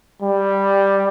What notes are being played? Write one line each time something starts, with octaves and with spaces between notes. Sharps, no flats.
G3